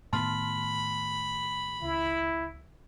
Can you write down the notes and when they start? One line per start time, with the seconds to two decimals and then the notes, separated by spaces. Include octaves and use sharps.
0.13 A2 D#3 B3 A5 B5 C6 F6
1.82 C#2 E4